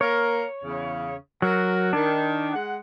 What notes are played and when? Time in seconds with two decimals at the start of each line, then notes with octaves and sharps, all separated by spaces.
0.01 A#3 A#4 C#5
0.64 E2 C#3
1.42 F#3 F#4 A#4
1.93 D#3 D4
2.53 G#3 F#5